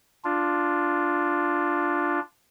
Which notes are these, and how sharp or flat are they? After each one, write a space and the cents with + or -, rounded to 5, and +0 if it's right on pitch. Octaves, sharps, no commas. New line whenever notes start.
D4 +0 F4 +0